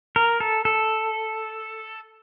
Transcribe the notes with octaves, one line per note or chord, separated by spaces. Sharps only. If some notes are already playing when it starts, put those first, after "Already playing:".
A#4
A4
A4